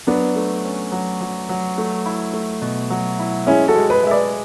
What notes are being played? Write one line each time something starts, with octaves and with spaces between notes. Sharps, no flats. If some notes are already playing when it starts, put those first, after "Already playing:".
F#3 B3 D4
A3
C#4
F#3
F#3
F#3
A3
E4
A3
B2
F#3
E4
G#3 C#4 E4
F#4 A4
G#3
G#4 B4
G#3 E5
B4 D5